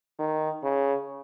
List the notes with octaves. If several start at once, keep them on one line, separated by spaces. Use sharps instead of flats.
D#3
C#3